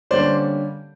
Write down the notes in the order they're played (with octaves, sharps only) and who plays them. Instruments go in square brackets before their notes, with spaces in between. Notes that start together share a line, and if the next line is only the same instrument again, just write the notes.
[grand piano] D3 G3 A#3 C#4 C5 D5